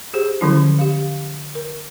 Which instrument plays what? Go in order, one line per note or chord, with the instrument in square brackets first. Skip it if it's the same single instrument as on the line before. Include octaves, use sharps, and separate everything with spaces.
[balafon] G4 G#4 C5
D3 D#3 F3 F#3 C#4 E4
G4 F5
A#4